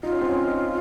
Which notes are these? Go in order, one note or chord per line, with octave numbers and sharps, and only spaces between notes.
D#4 F4
C#4
C4
C#4
D#4